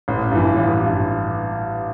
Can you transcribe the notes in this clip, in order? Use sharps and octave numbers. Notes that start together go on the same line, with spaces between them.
A1
G2 E3
A1
G2 E3